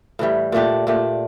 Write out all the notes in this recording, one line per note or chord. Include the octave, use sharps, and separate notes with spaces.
A2 E3 G3
A#2 A3 D4 G4
A#2 A3 D4 G4